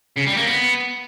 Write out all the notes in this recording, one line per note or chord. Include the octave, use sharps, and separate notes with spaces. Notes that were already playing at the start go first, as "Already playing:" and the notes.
C#3
G3
A#3
B3